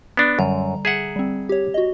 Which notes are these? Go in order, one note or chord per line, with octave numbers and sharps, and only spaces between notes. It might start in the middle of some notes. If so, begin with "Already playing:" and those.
B3 D4
F#2 D3 G3 A#5
G#4 E5 F#5
G3 C4
G4 C#5
F#4 D#5